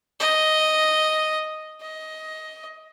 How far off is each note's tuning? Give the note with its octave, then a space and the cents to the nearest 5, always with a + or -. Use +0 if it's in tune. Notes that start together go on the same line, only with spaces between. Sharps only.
D#5 +0
D#5 +15